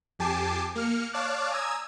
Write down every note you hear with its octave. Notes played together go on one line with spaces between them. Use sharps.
F2 G4 G#5 A5 D6 C7
A#3 F6 C#7
C#5 D5 F5 A5 D6 F#6
G#5 A#5 D#6 E6 G#6